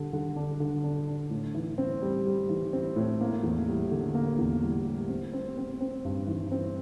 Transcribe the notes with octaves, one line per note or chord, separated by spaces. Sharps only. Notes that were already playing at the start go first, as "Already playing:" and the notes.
Already playing: D3 G3
D3
D4
D3
D4
D4
A2
E3
C4
G3
G3
E3
C4
A2
A#3
E2
G3
D3
A#3
E2
G3
G3
C4
C4
C4
C4
G2
E3
C4